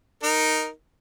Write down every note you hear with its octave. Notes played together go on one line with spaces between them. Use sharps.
D#4 A#4